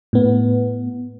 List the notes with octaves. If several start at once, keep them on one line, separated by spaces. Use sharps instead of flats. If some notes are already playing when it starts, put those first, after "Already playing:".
A2 B3